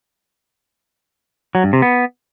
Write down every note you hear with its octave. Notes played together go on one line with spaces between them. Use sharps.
F#3
G2
C3
B3